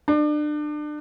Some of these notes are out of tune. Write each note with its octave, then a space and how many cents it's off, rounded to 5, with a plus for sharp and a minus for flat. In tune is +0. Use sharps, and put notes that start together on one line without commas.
D4 +30